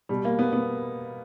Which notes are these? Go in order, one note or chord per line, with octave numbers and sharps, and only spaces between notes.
B2 G3
A#3
B3
B3